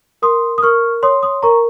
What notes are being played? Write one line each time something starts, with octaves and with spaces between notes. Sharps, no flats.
A#4 C6 D#6
D#6
A#4 C#6 F6
C#5 C6 D#6
C6 D#6
A#4 A#5 C#6